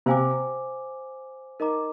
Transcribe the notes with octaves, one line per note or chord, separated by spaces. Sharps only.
C3 C5 F5 G#5 D6
D#4 A#4 D#5 A#5 D6